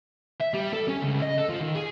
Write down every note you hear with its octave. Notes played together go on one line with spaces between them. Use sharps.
E5
G3
A4
C#4
C#2
D#5
A4
F3
D#3
G#4